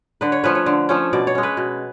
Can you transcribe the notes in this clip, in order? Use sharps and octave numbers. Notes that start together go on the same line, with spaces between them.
D3 B4
C#5
F3 A3 C#4 B4
C#5
D3
F3 A3 C#4
B2 D5
C#5
G#3 C#4
B4
B2